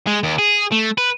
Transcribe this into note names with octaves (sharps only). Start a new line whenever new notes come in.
G#3
D#2
G#4
A3
B4